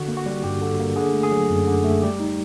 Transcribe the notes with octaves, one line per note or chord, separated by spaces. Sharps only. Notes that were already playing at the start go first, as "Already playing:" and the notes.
Already playing: D3 F#4
A#3
F#4
G3
G2 G4
D3
A#3
D3 G#4
A3
G#4
F#3
F#2
D3
A3
G3 G4
D#4